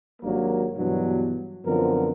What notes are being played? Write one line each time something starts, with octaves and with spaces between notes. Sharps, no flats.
G#1 F#3 G3 A#3 D4 A#4
G2 B2 E3 F#3 B3 D4
F#2 D3 F3 B3 C4 A#4